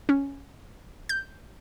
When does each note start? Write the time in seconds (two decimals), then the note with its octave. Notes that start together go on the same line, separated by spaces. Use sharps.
0.09 C#4
1.09 G6